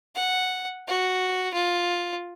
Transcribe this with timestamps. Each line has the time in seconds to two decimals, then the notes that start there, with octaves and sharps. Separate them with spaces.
0.15 F#5
0.88 F#4
1.53 F4